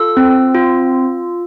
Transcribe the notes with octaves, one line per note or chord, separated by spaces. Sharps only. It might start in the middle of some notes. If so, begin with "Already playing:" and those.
Already playing: F4 A4 E6
C4
F4